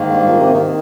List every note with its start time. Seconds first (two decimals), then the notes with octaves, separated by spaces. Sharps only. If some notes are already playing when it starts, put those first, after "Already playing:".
Already playing: G#2 D#3 A#3
0.12 G2
0.26 A#2
0.40 C3
0.54 D#3